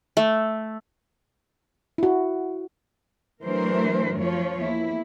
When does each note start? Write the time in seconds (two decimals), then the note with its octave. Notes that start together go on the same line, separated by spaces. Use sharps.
0.17 A3
1.98 E4 F#4
3.44 E3 F#3 A3 D4 A#4 C5
4.16 F#2 F3 C#5
4.59 E2 A#3 E4